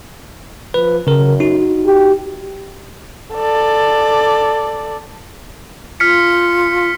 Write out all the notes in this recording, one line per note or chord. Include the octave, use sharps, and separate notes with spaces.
F3 B4
F#2 C#3 A#4
D#4 F#4
G4
A4 D5
F4 F6 B6 C#7